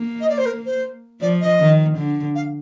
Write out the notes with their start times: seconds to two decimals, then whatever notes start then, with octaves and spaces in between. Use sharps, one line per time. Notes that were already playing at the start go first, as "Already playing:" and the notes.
Already playing: A#3
0.21 D#5
0.29 D5
0.38 C5
0.46 A#4
0.66 C5
1.21 F3 D5
1.41 D#5
1.60 D#3
1.98 D3
2.35 F5